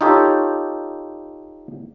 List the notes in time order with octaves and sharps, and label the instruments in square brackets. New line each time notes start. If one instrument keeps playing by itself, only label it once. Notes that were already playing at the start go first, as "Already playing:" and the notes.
[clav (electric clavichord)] D#4 F4 G4 A4 C#5